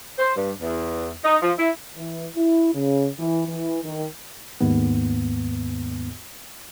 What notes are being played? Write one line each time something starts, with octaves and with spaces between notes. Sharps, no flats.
C5
G2
E2
D#4
F3
E4
E3
E4
C#3
E3
E3
D#3
D#2 G#2 B3